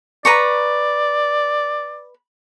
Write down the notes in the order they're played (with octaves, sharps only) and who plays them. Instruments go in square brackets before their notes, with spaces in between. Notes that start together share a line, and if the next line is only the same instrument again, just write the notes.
[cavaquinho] B4 A#5 C#6 [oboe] D5